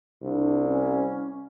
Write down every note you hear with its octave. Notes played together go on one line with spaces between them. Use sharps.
C2 D4
C#4